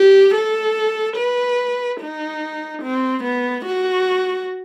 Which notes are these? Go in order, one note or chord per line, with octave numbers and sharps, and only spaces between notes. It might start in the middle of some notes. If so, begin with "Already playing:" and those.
Already playing: G4
A4
B4
D#4
C4
B3
F#4